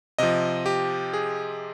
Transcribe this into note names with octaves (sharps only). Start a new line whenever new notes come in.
C3 F3 D#5
G4
G#4